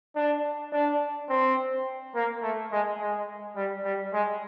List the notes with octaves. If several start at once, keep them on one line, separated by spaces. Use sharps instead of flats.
D4
D4
C4
A#3
A3
G#3
G#3
G3
G3
G#3